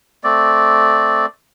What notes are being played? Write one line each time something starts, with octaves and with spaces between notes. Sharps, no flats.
A3 C4 D5